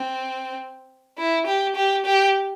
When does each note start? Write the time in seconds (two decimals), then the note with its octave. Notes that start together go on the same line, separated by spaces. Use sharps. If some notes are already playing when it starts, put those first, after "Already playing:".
Already playing: C4
1.18 E4
1.46 G4
1.76 G4
2.06 G4